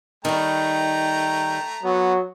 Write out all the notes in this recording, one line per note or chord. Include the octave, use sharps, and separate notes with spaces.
D#3 G3 A3 G5 A#5
F#3 B3